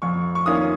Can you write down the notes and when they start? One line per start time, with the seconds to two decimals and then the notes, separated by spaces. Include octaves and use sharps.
0.02 F2 C#6
0.35 C#6
0.46 D#3 A#3 C#4 F4 D#6